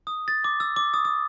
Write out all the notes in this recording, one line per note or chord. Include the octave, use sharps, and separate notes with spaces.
D#6
A6
D6
E6
D6
D#6
D#6